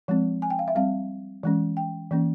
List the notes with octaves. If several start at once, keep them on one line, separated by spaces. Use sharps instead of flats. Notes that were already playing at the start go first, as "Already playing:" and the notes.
F3 G#3 C4
G#5
G5
F5
E5
G3 C4 F5
E3 G#3 C#4
G5
E3 A#3 C#4